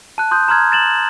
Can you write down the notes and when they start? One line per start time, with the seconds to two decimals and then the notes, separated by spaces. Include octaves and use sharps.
0.18 A5 F#6
0.31 C6 D#6 G6
0.48 A#5 C6 F6 G#6
0.72 A6 E7 F#7